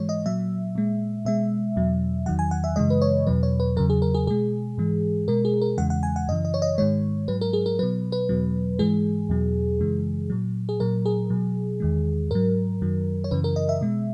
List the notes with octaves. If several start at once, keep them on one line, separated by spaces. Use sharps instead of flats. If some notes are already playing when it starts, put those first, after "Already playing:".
Already playing: G#2 E3 G#3 C#5
D#5
A#2 F#3 E5
A#2 G#3
B2 G#3 E5
E2 B2 F#3
E2 D#3 F#3 F#5
G#5
F#5
E5
F#2 C#3 E3 G#3 D#5
B4
C#5
E2 B2 F#3 B4
C#5
B4
E2 C#3 F#3 A#4
G#4
A#4
G#4
B2 G#3 G#4
G#2 E3 G#3
B2 G#3 A#4
G#4
A#4
E2 C#3 E3 G#3 F#5
F#5
G#5
F#5
F#2 C#3 E3 D#5
D#5
C#5
D#5
G#2 D#3 G#3 C#5
G#2 F#3 B4
A#4
G#4
A#4
B2 F#3 B4
B4
E2 B2 F#3
G#2 E3 G#3 G#4
E2 B2 F#3
F#2 C#3 E3 G#3
A#2 F#3
G#4
A#2 F#3 A#4
G#4
B2 F#3
E2 D#3 G#3
G#2 F#3 A#4
F#2 D#3 F#3
C#5
F#2 C#3 E3 B4
A#4
D#5
E5
B2 G#3